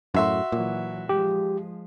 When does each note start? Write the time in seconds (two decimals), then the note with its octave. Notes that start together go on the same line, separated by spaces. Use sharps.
0.14 F#2 A2 F#4 E5 C6
0.52 A#2 E3 F#3
1.09 F3 G#3 G4